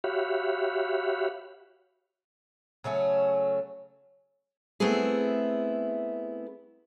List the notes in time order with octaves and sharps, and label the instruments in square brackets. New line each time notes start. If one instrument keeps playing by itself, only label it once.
[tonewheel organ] F#4 G4 C#5 E5 F5 B5
[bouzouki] C#3 F#3 A3 C#4
[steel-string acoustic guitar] A3 B3 C4 E4 G#4